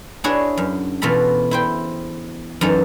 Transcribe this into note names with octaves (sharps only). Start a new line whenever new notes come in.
D4 E4 F#4 G#4 C#5
F#2
E2 B2 F4 A4 B5
E4 C5 G5
F#2 E3 D#4 A4